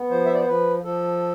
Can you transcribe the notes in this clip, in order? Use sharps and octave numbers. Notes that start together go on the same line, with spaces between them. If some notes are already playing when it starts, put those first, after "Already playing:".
Already playing: B3
F3 C5
E5
D5
C5
F3 B4
F3 A4